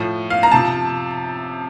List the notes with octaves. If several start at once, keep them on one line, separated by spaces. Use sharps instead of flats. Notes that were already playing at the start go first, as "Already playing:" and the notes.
Already playing: A2 F3
F5
A#5
C3 F3 A5